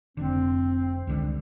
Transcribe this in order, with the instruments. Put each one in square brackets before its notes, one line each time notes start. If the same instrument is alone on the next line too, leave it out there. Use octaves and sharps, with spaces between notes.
[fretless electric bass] F1 D3 [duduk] C4
[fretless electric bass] C#2 D3 G3